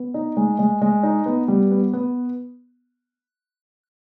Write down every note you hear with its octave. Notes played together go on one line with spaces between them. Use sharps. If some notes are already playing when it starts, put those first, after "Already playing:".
Already playing: B3
D#4
G#3
G#3
G#3
D#4
B3
G3
B3
B3